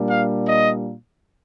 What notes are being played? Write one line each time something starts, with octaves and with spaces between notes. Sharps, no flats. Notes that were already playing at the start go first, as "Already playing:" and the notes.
Already playing: A#2 G3 A#3 D4
F5
D#5